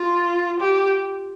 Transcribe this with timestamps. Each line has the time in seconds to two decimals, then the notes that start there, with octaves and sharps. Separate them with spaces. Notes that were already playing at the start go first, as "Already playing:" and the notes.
Already playing: F4
0.60 G4